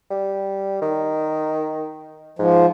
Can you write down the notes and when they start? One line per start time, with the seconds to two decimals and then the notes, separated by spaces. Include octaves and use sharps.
0.10 G3
0.82 D#3
2.39 G#2 F3